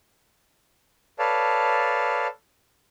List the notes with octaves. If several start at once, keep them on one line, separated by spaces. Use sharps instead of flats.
A4 B4 C#5 D5 F5 A5